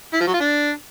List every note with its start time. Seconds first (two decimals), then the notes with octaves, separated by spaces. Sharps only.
0.14 E4
0.20 F3
0.27 F#3
0.34 F4
0.40 D4